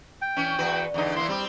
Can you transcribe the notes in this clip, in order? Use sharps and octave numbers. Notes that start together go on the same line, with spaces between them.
G5
E3 C#4
E2 F#4 B4
E2 D3 D#4
E3 A#3 E4 C6
G3 C4 G4